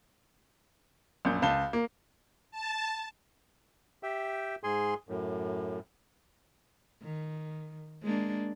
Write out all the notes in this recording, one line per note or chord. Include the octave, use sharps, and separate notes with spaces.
A#1 F#2 G6
C#2 A5 G7
A#3
A5
G4 E5 G5
G#2 G#4 G#5 C6
F#2 A2
D#3
G#3 A#3 D4